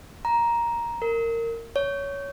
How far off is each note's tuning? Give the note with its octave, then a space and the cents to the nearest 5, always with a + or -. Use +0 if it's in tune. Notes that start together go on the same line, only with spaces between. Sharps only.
A#5 +10
A#4 -20
C#5 +15